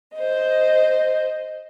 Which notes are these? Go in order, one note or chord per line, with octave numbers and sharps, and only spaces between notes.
C5 D#5